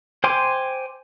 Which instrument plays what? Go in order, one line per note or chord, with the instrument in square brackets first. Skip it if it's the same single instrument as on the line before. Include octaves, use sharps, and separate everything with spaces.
[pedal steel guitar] C5 G5 G#5 C6 D6